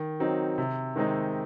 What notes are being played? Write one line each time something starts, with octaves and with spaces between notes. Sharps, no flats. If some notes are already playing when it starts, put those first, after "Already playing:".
Already playing: D#3
F#3 C4 D#4
C3
D#3 G#3 C4 D#4